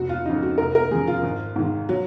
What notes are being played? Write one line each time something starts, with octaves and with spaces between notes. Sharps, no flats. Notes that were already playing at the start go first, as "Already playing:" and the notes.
Already playing: F1 F#4
F4
F2 C#3 D#4
F#4
F1 A#4
A#4
D#2 C#3 F3 G#4
F4
G#1
G#2 D#3
F#3